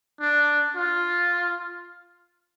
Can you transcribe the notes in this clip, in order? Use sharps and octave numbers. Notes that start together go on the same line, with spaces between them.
D4
F4